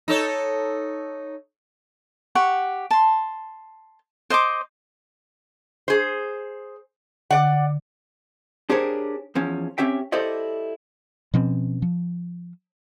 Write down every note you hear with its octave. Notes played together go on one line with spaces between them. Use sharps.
D#4 A4 C#5
G4 F#5 C#6
A5 C6
C5 D#5 C6 D6
G#4 C5
D3 D5 F#5
D4 G4 G#4 A#4 C5 C#5
E2 F3 C#4
C4 C#4 G4 E5 G5
E4 G4 A4 C5 D5 D#5
B2 F3 C4 C#4
F3